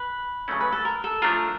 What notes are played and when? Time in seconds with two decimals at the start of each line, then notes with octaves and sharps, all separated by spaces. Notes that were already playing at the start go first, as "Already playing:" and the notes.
Already playing: B4
0.48 C#3 F#3 A3 C#4
0.61 B4
0.73 A4
0.85 A#4
1.04 A4
1.22 F3 A3 D4 F4 A#4